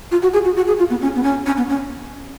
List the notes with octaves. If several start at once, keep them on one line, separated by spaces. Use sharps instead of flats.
F4
F#4
G#4
F#4
F#4
G#4
F4
B3
C#4
B3
C#4
C#4
B3
C#4